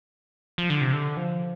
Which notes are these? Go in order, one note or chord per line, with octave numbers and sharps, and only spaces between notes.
F3
D3
C3
D3
F3